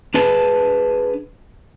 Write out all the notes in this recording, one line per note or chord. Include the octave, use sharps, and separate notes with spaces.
D4 G#4 B4 A5